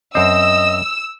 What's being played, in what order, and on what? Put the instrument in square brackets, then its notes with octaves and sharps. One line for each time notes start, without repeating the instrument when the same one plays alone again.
[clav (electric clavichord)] F#2 C4 [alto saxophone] D#5 [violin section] E6